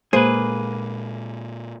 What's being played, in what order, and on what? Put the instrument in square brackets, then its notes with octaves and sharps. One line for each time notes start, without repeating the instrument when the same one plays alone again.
[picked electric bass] A#2 G#3 [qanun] A#3 [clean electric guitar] G#4 B4 [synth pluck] C5